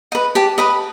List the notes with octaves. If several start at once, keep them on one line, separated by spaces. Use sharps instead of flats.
B4 D#5
G4 A5
B4 D#5 B5